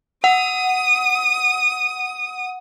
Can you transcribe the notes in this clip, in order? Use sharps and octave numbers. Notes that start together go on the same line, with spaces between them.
F#5 D#6